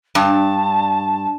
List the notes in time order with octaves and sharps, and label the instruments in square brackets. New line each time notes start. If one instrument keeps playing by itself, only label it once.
[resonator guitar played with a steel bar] G2 [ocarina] A5